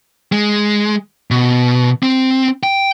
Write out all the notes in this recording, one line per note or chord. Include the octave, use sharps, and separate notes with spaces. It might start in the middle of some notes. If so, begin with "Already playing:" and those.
G#3
B2
C4
G5